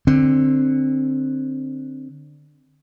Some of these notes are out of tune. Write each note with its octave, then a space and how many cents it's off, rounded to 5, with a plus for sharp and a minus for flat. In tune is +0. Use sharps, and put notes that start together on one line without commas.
D3 +15 C4 +10